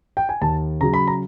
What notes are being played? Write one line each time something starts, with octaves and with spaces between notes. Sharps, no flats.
G5
G#5
D#2 A5
C#3 F#3 A#5
B5
A#5